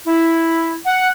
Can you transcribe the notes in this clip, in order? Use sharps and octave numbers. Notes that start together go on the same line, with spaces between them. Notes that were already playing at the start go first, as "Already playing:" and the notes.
E4
F#5